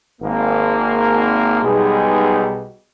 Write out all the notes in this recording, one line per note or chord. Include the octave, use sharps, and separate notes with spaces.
G#1 A#3
B1 B2 G3 G#3 D#4 G#4